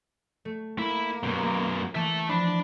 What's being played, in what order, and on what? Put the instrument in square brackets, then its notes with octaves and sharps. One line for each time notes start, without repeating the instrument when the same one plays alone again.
[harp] A3
[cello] A#3 [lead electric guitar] E4
[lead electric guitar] F#2 B2
[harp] E3 [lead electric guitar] E5 A5
[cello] F3 [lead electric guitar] D4 [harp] B5